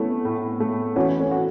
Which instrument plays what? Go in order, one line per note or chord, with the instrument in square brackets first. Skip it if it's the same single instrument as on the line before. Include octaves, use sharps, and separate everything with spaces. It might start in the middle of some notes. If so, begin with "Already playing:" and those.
Already playing: [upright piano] A3 [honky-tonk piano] B3 C#4 E4
[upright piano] A2
A3
[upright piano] E3 [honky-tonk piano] C#4 F#4
[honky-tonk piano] A3 C#4
[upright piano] F#4